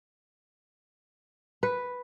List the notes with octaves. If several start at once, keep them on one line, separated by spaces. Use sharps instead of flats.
B4